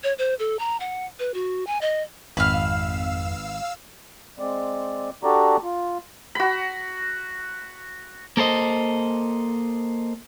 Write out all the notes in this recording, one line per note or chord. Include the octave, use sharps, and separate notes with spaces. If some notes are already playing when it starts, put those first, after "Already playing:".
C#5
C5
A4
A#5
F#5
B4
F#4
G#5
D#5
G#1 F2 B4 F5 E6 F6
G#3 C4 D5
D4 F#4 G4 A4 D5 A#5
F4
F#4 B5
A#3 A4 C5 D#5